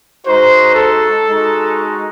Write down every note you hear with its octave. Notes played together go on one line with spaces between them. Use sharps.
G#3 D#4 F#4 C5
A4
G#3 D#4 F#4